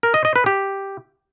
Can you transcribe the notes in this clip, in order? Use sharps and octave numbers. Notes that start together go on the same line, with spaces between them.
A#4
D#5
D#5
B4
G4